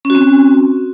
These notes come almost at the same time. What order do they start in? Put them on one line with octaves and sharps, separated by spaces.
C#4 F#4 C4